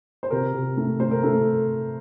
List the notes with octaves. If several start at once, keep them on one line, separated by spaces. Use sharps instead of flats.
C5
C3 A#4
C3
A3
A3 C5
A#4
A3 A4